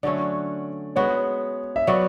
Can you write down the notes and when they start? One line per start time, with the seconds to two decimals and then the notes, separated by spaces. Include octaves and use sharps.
0.03 D3 F#3 A3 C#4 D5
0.96 G#3 B3 F#4 C#5
1.76 E5
1.87 F#3 B3 F#4 D5